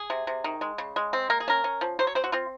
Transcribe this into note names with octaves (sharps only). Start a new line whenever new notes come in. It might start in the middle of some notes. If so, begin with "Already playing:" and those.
Already playing: G#4
C3
C3
D#3
G#3
C#3
G#3
C4
A#3 A#4
G#4
C#4 A#4
C#4
F3
F#3 C5
C#5
C4 C5
F#4
C4 F4